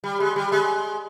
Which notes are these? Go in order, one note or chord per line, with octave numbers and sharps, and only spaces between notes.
G3
G#3
G3
G#3